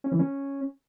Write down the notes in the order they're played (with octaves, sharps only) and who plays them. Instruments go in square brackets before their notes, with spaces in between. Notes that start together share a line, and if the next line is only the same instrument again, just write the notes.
[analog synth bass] C#4
E3
C#4